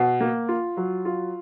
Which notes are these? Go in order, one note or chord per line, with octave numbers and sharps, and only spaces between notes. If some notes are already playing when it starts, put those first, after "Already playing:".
Already playing: B2 F#5
A#3
F4
F#3
F4